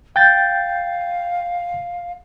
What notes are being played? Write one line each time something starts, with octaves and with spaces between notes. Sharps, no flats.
F5 G5 G6 A6